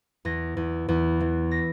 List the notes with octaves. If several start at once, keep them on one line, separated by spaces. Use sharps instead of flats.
E2 A#6
E2
E2
E3
A#6